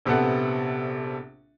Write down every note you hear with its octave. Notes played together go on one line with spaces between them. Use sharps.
A#1 C3 B3 A4 F#5